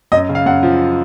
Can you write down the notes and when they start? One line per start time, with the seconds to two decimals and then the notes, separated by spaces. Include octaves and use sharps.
0.12 F#2 D#5
0.29 C#3
0.35 F5
0.46 F#2 F#5
0.63 F3